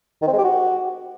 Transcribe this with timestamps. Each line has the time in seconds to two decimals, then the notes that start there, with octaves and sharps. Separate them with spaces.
0.22 D#3
0.27 C4
0.33 G#3
0.38 G4
0.44 F#4